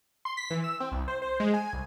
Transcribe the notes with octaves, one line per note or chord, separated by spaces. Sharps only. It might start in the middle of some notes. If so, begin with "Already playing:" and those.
C6
B6
E3
E6
C4
C2
C5
C5
G#3
G#5
C2